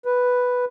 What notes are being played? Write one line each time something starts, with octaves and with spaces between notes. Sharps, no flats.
B4